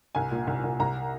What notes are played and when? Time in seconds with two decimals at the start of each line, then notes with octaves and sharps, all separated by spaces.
0.15 C2 G#5
0.31 A#2
0.47 C2
0.64 C2
0.80 C2 A#5